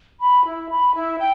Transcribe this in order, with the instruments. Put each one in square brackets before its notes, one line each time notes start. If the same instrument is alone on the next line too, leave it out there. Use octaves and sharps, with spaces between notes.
[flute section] B5
E4
B5
E4
G5